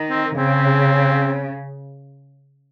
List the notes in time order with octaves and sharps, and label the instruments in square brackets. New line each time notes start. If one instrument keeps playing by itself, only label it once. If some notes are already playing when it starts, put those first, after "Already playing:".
Already playing: [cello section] D#3
[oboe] C4
[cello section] C#3 [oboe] C4